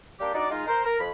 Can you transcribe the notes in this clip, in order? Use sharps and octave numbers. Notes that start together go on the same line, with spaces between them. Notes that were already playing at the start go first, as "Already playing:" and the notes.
G3 A#3 D4 G4
D4 D#4 F#4 D5
G#3 D#4 F4
A#4 C5
A#4
F2 B5